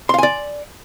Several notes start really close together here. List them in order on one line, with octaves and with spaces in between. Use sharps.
C6 F5 G#5 D5